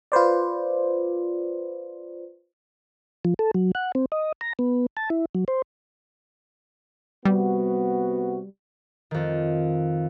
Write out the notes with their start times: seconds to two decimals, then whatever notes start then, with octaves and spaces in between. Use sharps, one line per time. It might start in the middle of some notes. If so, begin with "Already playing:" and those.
0.12 F4 B4 C5 D5
3.25 F3
3.39 A4
3.54 F#3
3.75 F#5
3.95 C4
4.12 D#5
4.41 A#5
4.59 B3
4.97 A5
5.10 E4
5.35 F#3
5.48 C5
7.25 C3 G3 B3 F#4
9.11 F2 D#3